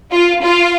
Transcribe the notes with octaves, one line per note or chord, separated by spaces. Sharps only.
F4
F4